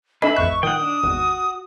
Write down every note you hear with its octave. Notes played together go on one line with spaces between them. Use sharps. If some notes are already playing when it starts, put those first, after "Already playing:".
D4 A4 B4 D#5 E5 G#5 B5
A1 F2 C#6 F#6
A#2 D#3 F#5 G5 D#6
D4
G#1 E2 F#4